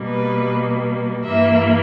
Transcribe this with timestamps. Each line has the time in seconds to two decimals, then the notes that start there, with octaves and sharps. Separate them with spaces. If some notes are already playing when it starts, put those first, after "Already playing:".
Already playing: B2 G3 A#3
0.09 B4
1.24 G2 E3 A#3 E5